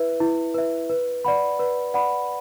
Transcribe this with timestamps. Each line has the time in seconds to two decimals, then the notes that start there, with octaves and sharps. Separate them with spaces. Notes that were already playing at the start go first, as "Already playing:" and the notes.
Already playing: E4 B4 E5
0.20 E4
0.54 B4 E5
0.89 B4
1.25 D5 F#5 B5
1.59 B4
1.94 D5 F#5 B5